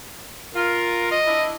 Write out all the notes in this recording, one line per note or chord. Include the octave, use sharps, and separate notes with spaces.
F4 A#4
D#5
D4 E4